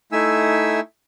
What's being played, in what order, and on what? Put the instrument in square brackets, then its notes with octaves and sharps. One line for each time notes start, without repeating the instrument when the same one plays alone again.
[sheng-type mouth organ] A3 D#4 E4 E5 G#5 E6